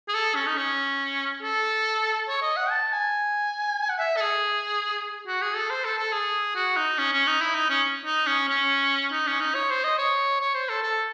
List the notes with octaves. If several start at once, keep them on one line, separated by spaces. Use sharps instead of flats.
G#4
A4
C#4
D#4
C#4
A4
C#5
D#5
F#5
A5
G#5
F#5
E5
A4
G#4
F#4
G#4
A4
C5
A4
A4
G#4
F#4
D#4
C#4
C#4
D#4
E4
D#4
C#4
D#4
C#4
C#4
D#4
C#4
D#4
C#5
C5
D#5
C#5
C#5
C5
A4
A4